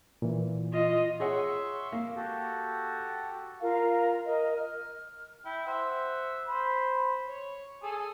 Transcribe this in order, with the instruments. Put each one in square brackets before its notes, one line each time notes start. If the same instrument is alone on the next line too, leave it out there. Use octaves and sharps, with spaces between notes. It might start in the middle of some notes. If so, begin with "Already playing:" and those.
[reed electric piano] A#2 E3
[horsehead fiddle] F4 D#5
[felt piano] G#4 C#5 F#5 [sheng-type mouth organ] E5 C6 C#6
[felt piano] A#3
[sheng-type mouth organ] F#4 G4 A4
[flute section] F4 A#4 F5
A#4 D#5
F6
[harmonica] E4 G5
C5 E5 F#5
C5 B5
C#5
G#4 A4